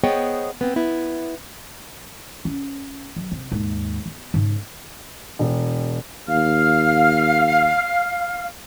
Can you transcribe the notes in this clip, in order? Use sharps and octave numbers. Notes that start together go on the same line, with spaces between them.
B3 G#4 C5 C#5 D#5 G5
B3 C4
B3 E4
C#4
F#3
C3
D#2 G#2
B3
G#2 C#3
E1
D#2 F5 F6